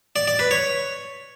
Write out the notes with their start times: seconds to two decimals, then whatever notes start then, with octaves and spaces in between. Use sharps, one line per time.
0.16 D5
0.27 D5
0.39 B4
0.51 C#5